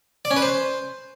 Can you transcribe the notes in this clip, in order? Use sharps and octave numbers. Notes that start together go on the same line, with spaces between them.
D5
C#4
B4
C5